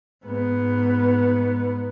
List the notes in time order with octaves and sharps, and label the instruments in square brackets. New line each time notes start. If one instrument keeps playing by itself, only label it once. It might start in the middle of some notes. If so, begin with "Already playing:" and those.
[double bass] G#2 B3